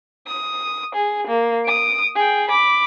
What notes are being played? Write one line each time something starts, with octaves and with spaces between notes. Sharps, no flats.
D#6
G#4
A#3
D#6 D7
G#4 G5
B5 D6